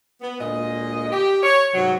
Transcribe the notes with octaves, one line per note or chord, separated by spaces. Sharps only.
B3
D2 A#2 G#3 D#5
G4
C#5
G#2 C3 F#3